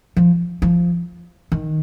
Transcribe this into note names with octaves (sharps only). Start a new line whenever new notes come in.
F3
F3
D#3